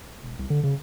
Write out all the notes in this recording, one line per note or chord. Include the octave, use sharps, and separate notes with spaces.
E1
C2
D3
C#3